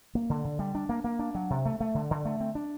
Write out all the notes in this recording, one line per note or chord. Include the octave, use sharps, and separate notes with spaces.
A#3
D3
D3
G3
D4
A#3
A#3
D4
F#3
C3
A3
A3
D3
D3
A3
C4
D4